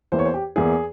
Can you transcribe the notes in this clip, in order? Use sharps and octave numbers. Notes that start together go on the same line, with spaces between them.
E2 E3 A#3 E4 C5
C#5
C5
G4
E2 E3 A#3 E4 G#4